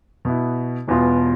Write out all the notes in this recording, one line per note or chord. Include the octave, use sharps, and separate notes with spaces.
B2 B3 E4
E1 E2 B2 B3 F4